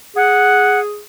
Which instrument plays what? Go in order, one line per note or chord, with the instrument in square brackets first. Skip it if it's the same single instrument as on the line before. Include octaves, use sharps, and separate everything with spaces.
[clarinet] G#4 [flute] F#5